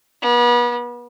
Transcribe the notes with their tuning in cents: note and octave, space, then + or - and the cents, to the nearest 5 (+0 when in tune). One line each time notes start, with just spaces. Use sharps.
B3 -35